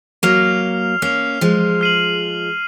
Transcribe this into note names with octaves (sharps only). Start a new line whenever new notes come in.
F#3 A#3 F6 C7 F7
A#3 C#4 F6 C7 F7
F3 G#3
F6 C7 D#7 F#7